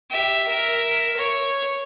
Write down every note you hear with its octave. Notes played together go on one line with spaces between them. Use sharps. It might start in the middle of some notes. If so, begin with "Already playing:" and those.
G4 E5
A#4 E5
C#5